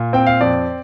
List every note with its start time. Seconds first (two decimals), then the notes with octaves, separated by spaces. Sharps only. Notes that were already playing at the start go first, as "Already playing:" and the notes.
Already playing: A#2
0.13 C4 G5
0.27 F5
0.41 F2 D5